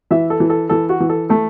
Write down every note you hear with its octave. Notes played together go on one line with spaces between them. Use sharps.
E3 E5
A4
E3
A4
E3 A4
F#4
E3
A4
A3 A4